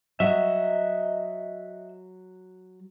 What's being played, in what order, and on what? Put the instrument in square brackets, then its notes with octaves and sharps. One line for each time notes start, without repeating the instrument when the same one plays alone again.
[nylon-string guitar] F#3 [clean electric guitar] D#5 E5